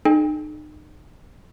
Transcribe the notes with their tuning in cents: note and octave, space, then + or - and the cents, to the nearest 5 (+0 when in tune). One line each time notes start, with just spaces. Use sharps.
D#4 -35 G#4 +45 G5 +35